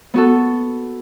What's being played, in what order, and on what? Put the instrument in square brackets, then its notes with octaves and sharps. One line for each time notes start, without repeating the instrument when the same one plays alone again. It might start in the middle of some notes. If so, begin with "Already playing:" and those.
[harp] B3 F#4 A4